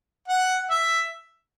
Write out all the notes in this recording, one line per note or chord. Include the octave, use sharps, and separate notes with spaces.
F#5
E5